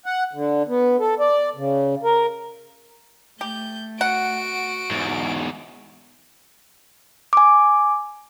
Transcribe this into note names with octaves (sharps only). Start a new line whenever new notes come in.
F#5
D3
B3
A4
D5
C#3
A#4
A3 G4 G6
F#4 F#5 D7
E2 G#2
G#5 D6